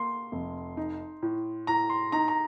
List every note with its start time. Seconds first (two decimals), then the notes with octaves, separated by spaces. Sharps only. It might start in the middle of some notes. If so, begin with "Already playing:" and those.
Already playing: A#3 C6
0.32 F1
0.77 D#4
1.23 A2
1.67 A2 A#5
1.90 C6
2.12 D#4 A#5
2.28 A#5